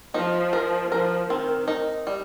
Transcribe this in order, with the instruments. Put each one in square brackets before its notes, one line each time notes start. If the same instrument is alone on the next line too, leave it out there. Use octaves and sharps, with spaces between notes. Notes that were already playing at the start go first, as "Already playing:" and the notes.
[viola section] F3 [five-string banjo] D#4
[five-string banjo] A#4
[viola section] F3 [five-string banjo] A#4
[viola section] D#3 [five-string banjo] C4
[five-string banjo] D#4
G3